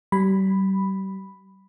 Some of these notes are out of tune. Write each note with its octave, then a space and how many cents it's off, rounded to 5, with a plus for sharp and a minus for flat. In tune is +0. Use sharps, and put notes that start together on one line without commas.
G3 -35 B5 +0